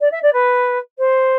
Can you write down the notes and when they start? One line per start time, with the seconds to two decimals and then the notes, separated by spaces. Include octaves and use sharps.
0.01 D5
0.11 E5
0.22 D5
0.33 B4
0.98 C5